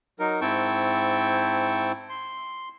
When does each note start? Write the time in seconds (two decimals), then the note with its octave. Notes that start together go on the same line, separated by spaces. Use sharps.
0.20 F#3 D#4 A#4
0.41 G#2 C4 E4 G5 A5 C#6
2.09 C6